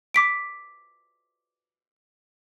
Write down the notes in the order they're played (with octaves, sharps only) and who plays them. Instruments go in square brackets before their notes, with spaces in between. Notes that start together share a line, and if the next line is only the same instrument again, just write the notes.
[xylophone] D6 B6 D7